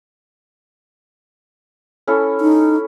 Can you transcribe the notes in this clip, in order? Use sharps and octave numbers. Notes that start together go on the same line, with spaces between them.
C#4 E4 A4
D#4